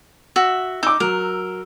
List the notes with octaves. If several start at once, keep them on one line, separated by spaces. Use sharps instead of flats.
F#4 E5
D#4 D6 E6
F#3 A#4